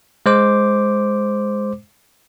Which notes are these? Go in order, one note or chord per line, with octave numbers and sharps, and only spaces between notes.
G#3 C5 D6